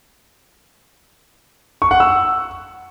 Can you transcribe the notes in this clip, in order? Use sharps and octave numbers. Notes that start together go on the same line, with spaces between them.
C#6
F#5
E6